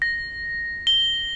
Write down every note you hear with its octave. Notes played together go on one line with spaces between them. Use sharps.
A#6
G7